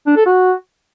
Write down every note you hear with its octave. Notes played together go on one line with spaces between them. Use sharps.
D4
A4
F#4